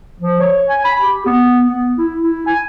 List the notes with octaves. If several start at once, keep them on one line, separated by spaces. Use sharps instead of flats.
F3
C#5
G#5
B5
G4
B3
B3
E4
E4
G#5